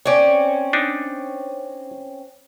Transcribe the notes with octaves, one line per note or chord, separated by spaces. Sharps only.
C4 C#4 C#5 D5
D4 D#4